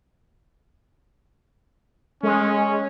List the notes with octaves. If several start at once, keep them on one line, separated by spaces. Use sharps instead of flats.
G#3 C#4